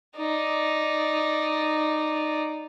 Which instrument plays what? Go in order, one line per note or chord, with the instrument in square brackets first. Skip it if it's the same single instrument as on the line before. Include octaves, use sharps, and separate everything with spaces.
[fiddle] D#4 D5